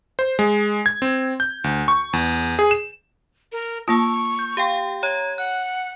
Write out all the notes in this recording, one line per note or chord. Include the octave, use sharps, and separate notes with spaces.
C5
G#3
G#6
C4
G6
D2
C#6
E2
G#4
E7
A#4
A#3 F4 A5 C#6 E6
G6
G4 F5 G5
C#5 A#5 G#6
F#5 F#6